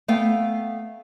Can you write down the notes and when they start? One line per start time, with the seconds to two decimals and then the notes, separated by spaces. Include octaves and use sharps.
0.08 A3 B3 F5 G5